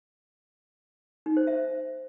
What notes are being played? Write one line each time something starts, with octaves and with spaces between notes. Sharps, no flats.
D#4
C5
E5